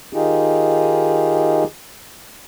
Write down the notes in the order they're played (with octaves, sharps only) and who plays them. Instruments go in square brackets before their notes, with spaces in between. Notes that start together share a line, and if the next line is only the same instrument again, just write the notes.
[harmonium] D#3 D#4 F4 G4 G#4